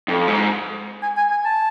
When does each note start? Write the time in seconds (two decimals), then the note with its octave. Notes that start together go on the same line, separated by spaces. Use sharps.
0.08 F2
0.28 G#2
1.03 G#5
1.17 G#5
1.30 G#5
1.45 A5